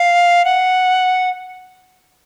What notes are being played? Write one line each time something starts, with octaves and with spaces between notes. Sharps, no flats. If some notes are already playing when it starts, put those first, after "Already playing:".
Already playing: F5
F#5